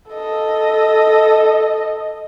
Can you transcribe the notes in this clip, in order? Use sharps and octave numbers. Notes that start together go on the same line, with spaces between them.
A4 D#5